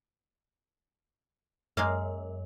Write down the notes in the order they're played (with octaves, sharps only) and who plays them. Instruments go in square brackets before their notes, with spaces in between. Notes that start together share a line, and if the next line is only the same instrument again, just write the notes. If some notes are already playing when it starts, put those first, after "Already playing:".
[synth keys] F#2 [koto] G#3 A#3 F5